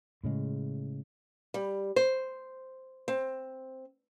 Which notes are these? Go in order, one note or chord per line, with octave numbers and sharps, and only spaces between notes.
A2 C#3 G#3
G3
C5
C4